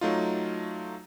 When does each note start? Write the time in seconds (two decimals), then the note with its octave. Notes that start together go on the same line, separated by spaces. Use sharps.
0.01 F#3 A3 D#4 F4